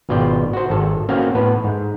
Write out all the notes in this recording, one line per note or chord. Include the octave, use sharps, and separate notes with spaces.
G#1 B2 F4 D5 G5
F#4 C5
G#1 A4
A#3 C4 C#4 F#4 F5
A2 B3 B4
G#2